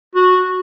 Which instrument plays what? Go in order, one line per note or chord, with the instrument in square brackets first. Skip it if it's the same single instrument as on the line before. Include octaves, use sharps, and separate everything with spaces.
[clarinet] F#4